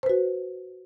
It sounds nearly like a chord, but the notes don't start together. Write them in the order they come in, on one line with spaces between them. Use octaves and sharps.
C5 B4 F#4